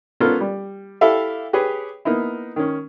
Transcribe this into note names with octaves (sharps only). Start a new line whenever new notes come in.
B3 C#4 F4 A4 A#4
G3
E4 G4 A4 E5 F5
G4 G#4 B4 C#5
A#3 B3 D#4 E4
D#3 C#4